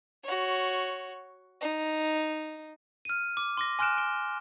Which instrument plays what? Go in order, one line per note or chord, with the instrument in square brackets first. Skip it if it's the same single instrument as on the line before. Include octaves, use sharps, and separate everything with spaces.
[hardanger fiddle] F#4 C#5
D#4
[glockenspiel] F6 D#7
D6
C6 D6 A#6
G#5 C6 F6 F#6 D7 E7
D7 G7